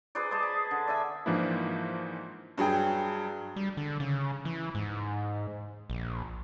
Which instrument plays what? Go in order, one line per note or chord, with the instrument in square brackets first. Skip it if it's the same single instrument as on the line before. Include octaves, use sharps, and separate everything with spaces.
[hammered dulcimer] G#4 B4 C5 D5
G#4 C5 D#5 A5
B5
D3
D5 E5 G#5
[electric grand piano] G#2 E3 F3 A#3 D4 E4
[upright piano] G2 F#3 G#4 G5
[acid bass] G3
D3
C#3
E3
G#2
A#1